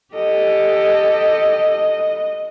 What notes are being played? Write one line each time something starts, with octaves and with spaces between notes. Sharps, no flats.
G4 A4 D#5